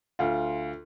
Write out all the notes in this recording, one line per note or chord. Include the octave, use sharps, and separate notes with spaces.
D2 F4